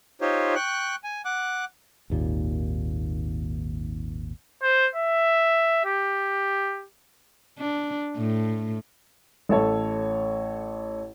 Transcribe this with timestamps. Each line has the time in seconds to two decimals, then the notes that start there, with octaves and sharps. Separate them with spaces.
0.21 D#4 F4 G4 C5 C#5
0.55 G5 C#6 F#6
1.04 G#5
1.25 F#5 D6 F#6
2.10 G#1 D#2 A#2
4.62 C5
4.95 E5
5.85 G4
7.59 D4
8.17 A2
9.49 A1 A4 C#5